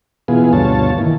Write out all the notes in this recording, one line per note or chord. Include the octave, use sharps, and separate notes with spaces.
B2 E3 B3 F4 G#4
D2 G2 B2 F4 C#5 A5
D#3 E3 A#3